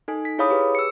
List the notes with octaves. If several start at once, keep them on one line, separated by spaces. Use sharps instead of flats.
D#4 A4 G#5
B6
E4 G#4 C#5 F5 B5 D#6
G4 G#4 B4
E6 C#7